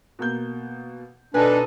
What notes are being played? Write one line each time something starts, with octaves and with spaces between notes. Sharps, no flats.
B2 A#3 G6
B2 D4 D#4 A4 B4 G#5